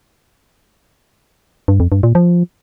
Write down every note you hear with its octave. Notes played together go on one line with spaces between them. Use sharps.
G2
F2
G2
A#2
F3